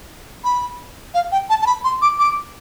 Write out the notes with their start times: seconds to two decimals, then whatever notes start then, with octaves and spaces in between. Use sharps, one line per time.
0.44 B5
1.14 F5
1.32 G5
1.50 A5
1.62 A5
1.66 B5
1.84 C6
2.02 D6
2.19 D6